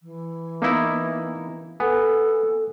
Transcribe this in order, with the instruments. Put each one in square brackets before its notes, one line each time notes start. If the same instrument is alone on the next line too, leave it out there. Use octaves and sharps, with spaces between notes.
[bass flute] E3
[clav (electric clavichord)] A#3 D#4 E4 [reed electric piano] B3
[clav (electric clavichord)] B3 [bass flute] A4 [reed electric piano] G#5